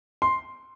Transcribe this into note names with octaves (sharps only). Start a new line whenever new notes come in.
C6